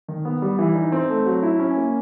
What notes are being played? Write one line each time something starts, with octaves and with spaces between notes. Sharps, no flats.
D#3
B3
G3
E3
D#4
C4
A3
F#3
E4
C#4
A#3